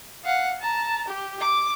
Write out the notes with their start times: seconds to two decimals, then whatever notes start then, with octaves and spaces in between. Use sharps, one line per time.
0.25 F5 F#5
0.61 A5 A#5
1.08 G4
1.40 D6